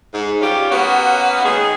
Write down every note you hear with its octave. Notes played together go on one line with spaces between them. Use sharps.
G#2
G3 C#4 F4 G4
A#3 B3 C#4 F#4
D#3 G#3 D#4 G#4